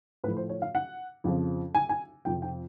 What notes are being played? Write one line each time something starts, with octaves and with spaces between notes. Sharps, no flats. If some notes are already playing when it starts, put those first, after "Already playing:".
A2 F3 B4
C5
C#5
F5
F#5
F2 C#3 F3
G#5
G#5
F2 C3 F3 G5
G5